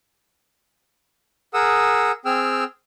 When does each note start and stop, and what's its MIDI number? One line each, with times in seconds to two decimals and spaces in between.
1.54 2.12 68
1.54 2.12 70
1.54 2.12 78
1.54 2.12 87
1.54 2.12 88
2.25 2.64 60
2.25 2.64 68
2.25 2.64 79
2.25 2.64 88
2.25 2.64 89